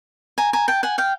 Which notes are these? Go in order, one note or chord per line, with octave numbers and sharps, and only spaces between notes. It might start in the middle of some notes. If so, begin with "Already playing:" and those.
G#5 A#5
G#5 A#5
G5 A5
F#5 G#5
F5 G5